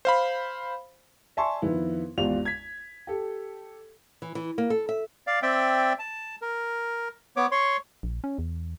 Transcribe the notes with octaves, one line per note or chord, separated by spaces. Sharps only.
C5 F5 B5
D5 E5 G#5 A5 C6 C#6
F2 D#3 B3 E4
G#1 E2 F4 G4 D5 F7
G#6 B6
G4 A4
E3
E3
A#3
A4
E5
D5 F5
C4 D5 E5 G5
A5
A#4
B3 C#5 D6
C#5 C6 C#6
A#1
C#4
E2